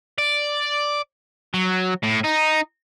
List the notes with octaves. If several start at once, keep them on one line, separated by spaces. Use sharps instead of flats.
D5
F#3
A2
D#4